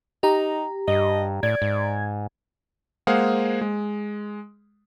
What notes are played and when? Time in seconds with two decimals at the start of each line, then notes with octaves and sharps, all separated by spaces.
0.23 D#4 G4 A#5
0.88 G2 D#5
1.43 A2 D5 G#6
1.62 G#2
3.07 G#3 A#3 G#4 C5 F5 F#5
3.61 G#3